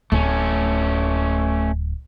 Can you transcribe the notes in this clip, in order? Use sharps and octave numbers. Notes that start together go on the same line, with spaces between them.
D1 A3 C#4